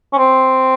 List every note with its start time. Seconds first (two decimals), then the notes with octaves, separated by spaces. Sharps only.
0.13 C#4
0.18 C4